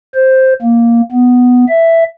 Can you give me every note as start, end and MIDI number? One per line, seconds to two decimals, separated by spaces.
0.14 0.53 72
0.62 1.01 58
1.12 1.65 59
1.68 2.04 76